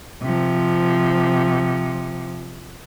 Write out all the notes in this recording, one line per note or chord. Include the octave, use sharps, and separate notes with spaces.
C3 F3